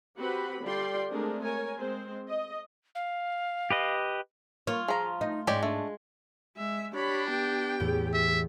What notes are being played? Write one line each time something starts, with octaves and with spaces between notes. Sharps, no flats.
C4 F#4 G4 B4 F#5 B5
D3 G3 F4 D5 G5 C6
G#3 A3 C4 D4 G#4 A#4
A#4 C#5 G#5
G#3 C4 C5
D#5
F5
G4 B4 D#5
A#3 F4 C#5
F3 G#4 A#5
A3 D#4
G#2 G#3 C#4 G4 D5
A3 D4
G#3 E5
D4 G4 C#5 B5
B3 G4 G5
E2 A2
E5